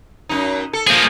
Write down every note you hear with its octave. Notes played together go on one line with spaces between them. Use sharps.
F#2 D#4
A4
F3 A3 A#3 G#4